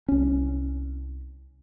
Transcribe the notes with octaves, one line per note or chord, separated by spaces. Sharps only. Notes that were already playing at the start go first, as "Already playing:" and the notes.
C2 C#4